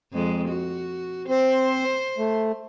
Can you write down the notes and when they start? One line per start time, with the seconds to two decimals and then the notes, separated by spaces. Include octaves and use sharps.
0.14 F2 G#3
0.48 F#4
1.29 C4 C5
2.18 A3